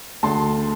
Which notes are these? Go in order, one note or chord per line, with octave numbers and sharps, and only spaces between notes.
D2 D3 A5 C6